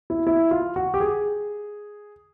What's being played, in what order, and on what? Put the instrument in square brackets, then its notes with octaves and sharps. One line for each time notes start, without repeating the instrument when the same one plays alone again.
[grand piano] E4
E4
F4
F#4
G4
G#4